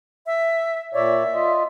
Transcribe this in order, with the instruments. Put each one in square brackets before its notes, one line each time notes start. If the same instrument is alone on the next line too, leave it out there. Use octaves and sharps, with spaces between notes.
[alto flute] E5
[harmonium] A#2 C#5 D5 [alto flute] E5
[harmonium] F4 D#5